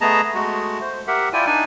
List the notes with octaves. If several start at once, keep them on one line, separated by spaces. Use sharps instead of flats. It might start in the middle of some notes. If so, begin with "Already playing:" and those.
A3 B3 G#4 D#5 A5 A#5
G#3 A3 F#4
C5
G4 A#4 E5 F#5
E4 F4 D5 G5 G#5
D4 D#4 D5 G#5